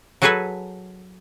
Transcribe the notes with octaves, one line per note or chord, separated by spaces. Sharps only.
F#3 F#4 G#4 A4 B4 G#5